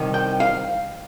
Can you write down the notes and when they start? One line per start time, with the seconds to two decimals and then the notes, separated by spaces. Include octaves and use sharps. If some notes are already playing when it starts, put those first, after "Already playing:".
Already playing: C2 D#3
0.14 G5
0.40 F5